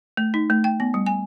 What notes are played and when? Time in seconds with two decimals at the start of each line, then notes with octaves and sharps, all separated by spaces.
0.17 A3
0.34 D#4
0.50 A3
0.64 G5
0.80 B3
0.94 G3
1.06 G#5